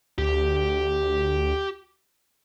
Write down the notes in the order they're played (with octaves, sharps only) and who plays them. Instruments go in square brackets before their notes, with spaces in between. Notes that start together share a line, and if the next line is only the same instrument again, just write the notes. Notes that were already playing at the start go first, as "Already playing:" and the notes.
[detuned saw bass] D2 [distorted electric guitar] G4